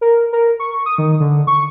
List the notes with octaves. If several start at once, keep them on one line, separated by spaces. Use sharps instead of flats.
A#4
A#4
C#6
D#6
D#3
D3
C#6